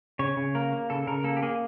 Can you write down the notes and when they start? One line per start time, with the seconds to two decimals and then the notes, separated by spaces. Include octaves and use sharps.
0.19 C#3 C#5
0.37 C#3
0.55 A#3 A#4
0.73 A#3
0.90 C#3 A4
1.07 C#3 A#4
1.24 A#3 A4
1.37 G4
1.43 A#3 G#4